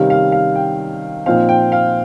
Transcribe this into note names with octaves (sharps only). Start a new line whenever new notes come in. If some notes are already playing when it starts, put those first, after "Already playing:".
Already playing: C3 D#3 G3 C#4 F5
F5
F5
G5
A#2 F3 C4 D#4 F5
G5
F5